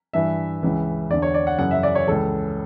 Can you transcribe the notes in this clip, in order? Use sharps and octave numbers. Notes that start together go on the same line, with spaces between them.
G2 E3 E5
C#2 C#3 E3
E2 D3 D5
C#5
D5
F#5
F#2 C#3 E3 F#5
E5
D5
C#5
C#2 C#3 E3 A4